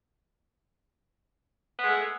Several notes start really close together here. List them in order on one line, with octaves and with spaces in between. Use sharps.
B3 G#3 A3